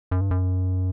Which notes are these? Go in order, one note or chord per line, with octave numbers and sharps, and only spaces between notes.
F#2
G2
F#2